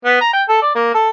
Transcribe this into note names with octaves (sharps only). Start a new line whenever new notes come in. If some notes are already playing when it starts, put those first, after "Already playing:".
B3
A#5
G5
A4
D5
A#3
A4